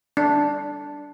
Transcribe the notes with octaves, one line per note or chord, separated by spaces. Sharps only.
D4